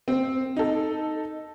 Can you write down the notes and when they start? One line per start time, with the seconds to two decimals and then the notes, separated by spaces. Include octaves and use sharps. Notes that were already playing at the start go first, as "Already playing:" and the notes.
0.08 C4
0.57 D#4 A4